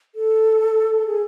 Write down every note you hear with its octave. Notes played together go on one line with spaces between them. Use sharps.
A4
G#4